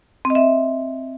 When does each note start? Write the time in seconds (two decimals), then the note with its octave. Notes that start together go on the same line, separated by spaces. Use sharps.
0.25 C4
0.30 D#5
0.35 E5